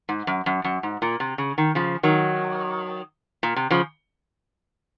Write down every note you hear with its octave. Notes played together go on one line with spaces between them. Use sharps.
G#2
F#2
F#2
F#2
G#2
A#2
C3
C#3
D#3
C#3 F3
D#3 F#3
A#2
C3
C#3 F3